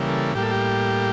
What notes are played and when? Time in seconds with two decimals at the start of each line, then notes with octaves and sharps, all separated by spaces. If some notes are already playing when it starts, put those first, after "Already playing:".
Already playing: C#3 E3 G3 A#3
0.08 A4
0.35 A2 G3 A#3 G4
0.43 A4
0.51 G4